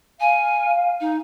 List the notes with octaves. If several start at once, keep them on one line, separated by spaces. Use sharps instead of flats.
F5 G#5
D#4